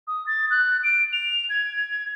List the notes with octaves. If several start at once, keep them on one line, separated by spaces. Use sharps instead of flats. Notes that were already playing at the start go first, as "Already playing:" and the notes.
D#6
A6
F#6
D7
F7
G#6